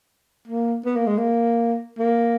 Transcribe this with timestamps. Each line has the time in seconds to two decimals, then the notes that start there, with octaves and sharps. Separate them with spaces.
0.48 A#3
0.85 B3
0.96 A#3
1.07 G#3
1.18 A#3
1.98 A#3